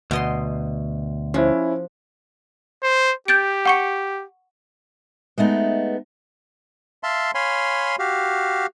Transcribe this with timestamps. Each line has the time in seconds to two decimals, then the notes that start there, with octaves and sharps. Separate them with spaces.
0.11 D2 B2 D#5 C6
1.34 F3 C#4 E4 G4 C5
2.83 C5
3.28 G4 G6 A6 D7
3.65 F#5 C#6 C#7
5.38 G#3 A3 B3 D#4
7.03 E5 F5 A5 C6
7.35 C#5 F5 G#5 B5 C6
7.99 F#4 G4 F5